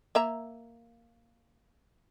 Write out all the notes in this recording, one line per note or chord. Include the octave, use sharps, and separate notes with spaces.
A#3 E5 A#5